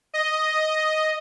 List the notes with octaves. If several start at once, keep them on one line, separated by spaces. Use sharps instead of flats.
D#5